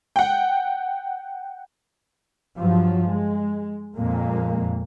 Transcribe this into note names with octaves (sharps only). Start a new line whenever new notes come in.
F#5 G5
G2 F3 F#3
G#3
F2 A#2 G#3 A#3